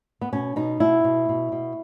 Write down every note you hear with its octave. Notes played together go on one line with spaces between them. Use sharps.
B3
B2 C#4
B2 D#4
B2 E4
B2
B2
B2